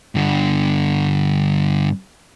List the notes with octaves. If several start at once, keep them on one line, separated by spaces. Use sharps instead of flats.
G2 D3